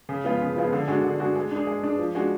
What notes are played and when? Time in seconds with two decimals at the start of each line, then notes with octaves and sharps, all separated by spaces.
0.09 C#3
0.24 F3 G#3 B3 F4
0.41 C#3
0.56 F3 G#3 B3 F4
0.73 D3
0.88 G#3 D4 F#4
1.04 D3
1.20 G#3 D4 F#4
1.35 G#3
1.51 D4 G#4
1.67 G#3
1.83 D4 G#4
1.99 F3
2.15 G#3 D4 F#4